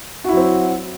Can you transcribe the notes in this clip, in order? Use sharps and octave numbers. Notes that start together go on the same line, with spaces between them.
F#3 C4 E4 F#4